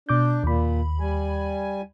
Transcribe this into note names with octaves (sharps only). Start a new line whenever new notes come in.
B2 D4 D6 G6
D#2 A#2 B5
G3 G#5